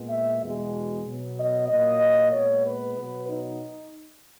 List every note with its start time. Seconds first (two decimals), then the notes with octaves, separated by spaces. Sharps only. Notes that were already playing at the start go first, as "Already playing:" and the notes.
Already playing: A#2 G#3 B3
0.09 E5
0.41 E2 B2 G#3
1.05 B2 F#3 B3
1.38 D#5
1.69 A#2 F#3 A#3 D#5
2.33 A#2 G#3 B3 C#5
2.65 B4
2.97 B2 F#3 B3
3.29 D#4